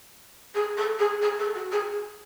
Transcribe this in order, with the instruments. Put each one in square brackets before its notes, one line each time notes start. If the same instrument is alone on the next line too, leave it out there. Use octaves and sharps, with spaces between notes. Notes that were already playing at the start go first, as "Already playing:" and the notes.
[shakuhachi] G#4
A4
G#4
G#4
A4
F#4
G#4